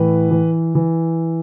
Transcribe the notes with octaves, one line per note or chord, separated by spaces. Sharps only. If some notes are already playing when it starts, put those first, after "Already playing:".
Already playing: A2 E3 B4
E3
E3